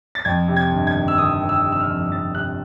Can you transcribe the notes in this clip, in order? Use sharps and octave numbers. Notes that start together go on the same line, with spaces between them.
A6
F2 G#6
C3
G#6
G1
G#6
D#3
E6
D#3 D#6
D#3
E6
C3
E6
F6
F2
F2 A6
C3 F#6